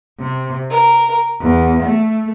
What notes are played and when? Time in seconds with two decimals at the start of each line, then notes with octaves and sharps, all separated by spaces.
0.19 C3
0.69 A#4
1.39 E2
1.82 A3